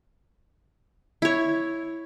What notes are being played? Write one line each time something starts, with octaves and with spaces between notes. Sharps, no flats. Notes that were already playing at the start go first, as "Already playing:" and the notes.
E4 C#5